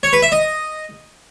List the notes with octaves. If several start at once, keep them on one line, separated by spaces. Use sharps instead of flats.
C#5
B4
E5
D#5